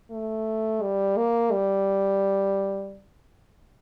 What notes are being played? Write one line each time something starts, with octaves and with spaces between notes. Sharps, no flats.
A3
G3
A#3
G3